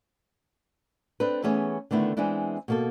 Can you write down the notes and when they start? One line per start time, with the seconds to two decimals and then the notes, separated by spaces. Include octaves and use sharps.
1.20 C4 D4 A4 B4
1.43 E3 A3 B3 C#4 G#4 C#5
1.91 D3 D#3 A3 B3 E4
2.17 E3 G#3 B3 C4 D4 E4
2.68 B2 A#3 A4